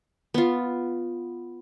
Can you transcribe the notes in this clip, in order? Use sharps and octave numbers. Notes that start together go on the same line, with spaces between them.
B3 F4